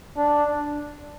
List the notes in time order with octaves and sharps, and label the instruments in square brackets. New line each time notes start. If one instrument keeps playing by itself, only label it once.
[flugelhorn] D4